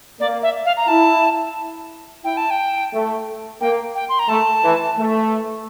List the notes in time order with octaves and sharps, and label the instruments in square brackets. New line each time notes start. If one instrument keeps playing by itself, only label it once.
[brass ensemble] A#3 [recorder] D5
[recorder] E5
F5
A#5
[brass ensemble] E4 [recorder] A5
[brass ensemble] E4 [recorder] G5
[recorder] A5
G5
[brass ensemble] A3
[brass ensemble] A#3 [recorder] G5
[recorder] G5
C6
A#5
[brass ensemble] A3 [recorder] A5
[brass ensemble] E3
A3